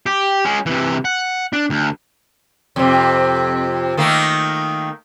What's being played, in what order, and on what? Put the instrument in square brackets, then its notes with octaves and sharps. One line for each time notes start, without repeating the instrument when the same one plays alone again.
[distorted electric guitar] G4
G#3 C#4
C3 E3
F#5
D4
D2
[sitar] F2 C3
D#3 A3 A#3